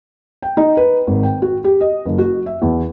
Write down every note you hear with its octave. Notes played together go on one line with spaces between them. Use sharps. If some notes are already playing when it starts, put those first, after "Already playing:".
G5
D#4
B4
G#1
G5
F#4
G4
D#5
F#1
F#4
E5
E2